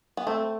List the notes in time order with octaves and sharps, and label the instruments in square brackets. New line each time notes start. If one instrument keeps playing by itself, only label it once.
[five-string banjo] B3
[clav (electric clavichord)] A3 [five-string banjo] C4